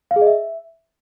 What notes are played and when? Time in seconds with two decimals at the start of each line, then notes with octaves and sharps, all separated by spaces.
0.11 F5
0.16 G#4
0.21 D#5
0.27 E5